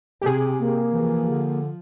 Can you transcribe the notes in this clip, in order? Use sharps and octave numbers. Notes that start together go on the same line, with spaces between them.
C3 G4 G#4
A#3
E3 F3
D3